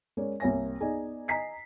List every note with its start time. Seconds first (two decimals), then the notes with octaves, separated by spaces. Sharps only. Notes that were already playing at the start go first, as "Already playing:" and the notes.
0.17 G#3 C#4 A#4 C#5 D5
0.40 C2 A#3 C#5 G#5 A#6
0.80 B3 D#4 G#4 D5 D#5 G#5
1.28 D#5 G#5 A#5 B6 C7